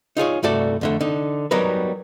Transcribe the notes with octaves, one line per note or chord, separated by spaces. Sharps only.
D#4 F4 G#4 C#5
C2 G2 A3 F#4 A4 D5
F2 D3 A3
D3 D#4
F#3 G3 B3 D#4 A#4 B4